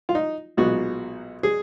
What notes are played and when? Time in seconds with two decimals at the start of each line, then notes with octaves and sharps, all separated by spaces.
0.09 F4
0.15 D#4
0.57 B1 A#2 G#3 B3 D#4 F#4
1.43 G#4